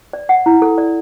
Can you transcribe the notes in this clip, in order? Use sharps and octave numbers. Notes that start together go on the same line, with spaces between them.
D5
F#5
E4
A4
D5